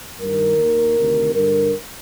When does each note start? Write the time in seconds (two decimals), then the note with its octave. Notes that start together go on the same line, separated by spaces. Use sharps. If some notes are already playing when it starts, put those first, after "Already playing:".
0.19 G2 D#3 A#4
0.58 D#2 D#3
0.96 D2 C3 D#3
1.34 G2 D3 A#4